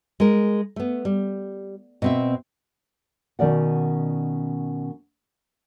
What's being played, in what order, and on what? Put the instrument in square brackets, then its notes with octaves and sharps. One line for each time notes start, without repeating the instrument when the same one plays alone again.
[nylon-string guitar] G#3 A#4
A3 B3
G3
B2 C4 E5
B2 D#3 C#4 D5 F#5